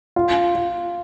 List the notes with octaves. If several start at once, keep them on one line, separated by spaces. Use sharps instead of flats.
F4
F4